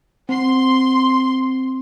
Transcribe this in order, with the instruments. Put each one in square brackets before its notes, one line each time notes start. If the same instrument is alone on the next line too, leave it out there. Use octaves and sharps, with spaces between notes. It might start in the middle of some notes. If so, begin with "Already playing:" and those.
[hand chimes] C4 [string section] C6